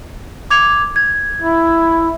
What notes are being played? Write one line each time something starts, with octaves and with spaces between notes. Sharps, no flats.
D6 G#6 F7
G#6
E4